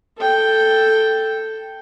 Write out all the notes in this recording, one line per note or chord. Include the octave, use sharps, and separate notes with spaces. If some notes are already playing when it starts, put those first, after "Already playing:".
A4 G5